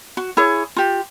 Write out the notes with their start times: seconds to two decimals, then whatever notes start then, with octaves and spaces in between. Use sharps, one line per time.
0.17 F#4
0.37 E4 G#4 C#5
0.76 F4 G4